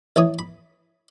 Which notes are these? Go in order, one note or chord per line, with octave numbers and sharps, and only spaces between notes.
A1 E3 C#5 D#6
B5